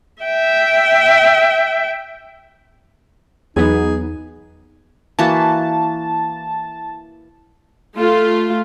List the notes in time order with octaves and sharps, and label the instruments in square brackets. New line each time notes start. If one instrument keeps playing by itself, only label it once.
[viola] E5 G5
[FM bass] E2 [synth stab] F#3 B3 [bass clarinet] D#4 [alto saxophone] G#4
[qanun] E3 A#3 F#4 [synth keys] A5
[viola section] A3 F4